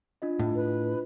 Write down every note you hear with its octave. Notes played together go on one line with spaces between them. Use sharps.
D4 F4 D#5
A2
B4